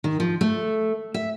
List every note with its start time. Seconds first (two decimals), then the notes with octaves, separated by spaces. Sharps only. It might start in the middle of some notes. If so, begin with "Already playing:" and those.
0.04 D#3
0.20 F3
0.41 A3
1.14 E5